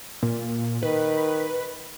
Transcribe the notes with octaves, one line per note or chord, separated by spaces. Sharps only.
A#2
D#3 B4